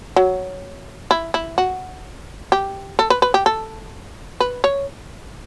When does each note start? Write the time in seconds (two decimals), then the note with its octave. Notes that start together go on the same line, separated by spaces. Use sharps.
0.16 F#3
1.11 E4
1.34 E4
1.58 F#4
2.52 G4
2.99 A4
3.10 B4
3.22 B4
3.34 G4
3.46 A4
4.40 B4
4.64 C#5